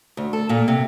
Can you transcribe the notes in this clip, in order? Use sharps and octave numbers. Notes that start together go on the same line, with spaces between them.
D2
A4
A#2
C3